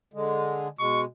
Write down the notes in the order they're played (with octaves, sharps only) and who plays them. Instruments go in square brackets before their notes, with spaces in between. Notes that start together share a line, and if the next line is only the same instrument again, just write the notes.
[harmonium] D3 G#3
[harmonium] B2 G#3 [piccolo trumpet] C#6